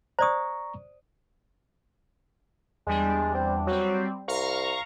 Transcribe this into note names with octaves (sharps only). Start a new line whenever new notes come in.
C5 D5 A#5 C#6 D#6
E2 G3 G#3 D4
C4
F#3 G3 C4
C2 F5 A#5 C#6